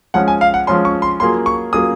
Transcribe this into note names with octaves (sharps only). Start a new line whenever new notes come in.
F3 G#3 C#4 F#5
G#5
F5
F#5
F3 G#3 C#4 C6
C#6
C6
F#3 A#3 F4 G#4 C6
C#6
F#3 A#3 F4 G#4 D#6